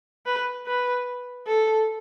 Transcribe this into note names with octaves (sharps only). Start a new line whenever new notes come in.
B4
B4
A4